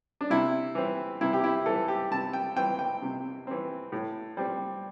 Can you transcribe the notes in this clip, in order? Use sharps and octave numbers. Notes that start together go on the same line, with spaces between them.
D4
C3 E4
E3 C4
C3 E4
G4
E4
E3 C4 A4
G4
C3 A5
G5
E3 C4 G5
G5
C3
E3 C4
A2
G3 C4